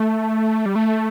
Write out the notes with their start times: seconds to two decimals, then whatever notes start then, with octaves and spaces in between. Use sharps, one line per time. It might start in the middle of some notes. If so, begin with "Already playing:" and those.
Already playing: A3
0.66 G3
0.76 A3